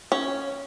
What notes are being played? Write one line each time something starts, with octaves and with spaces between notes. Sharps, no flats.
C#4